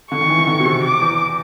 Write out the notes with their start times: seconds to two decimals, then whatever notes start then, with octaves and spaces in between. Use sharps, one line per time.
0.11 D3 C#6
0.21 D#3
0.30 E3
0.39 D#3
0.47 D3
0.60 B2
0.65 C3
0.83 D6
1.01 E2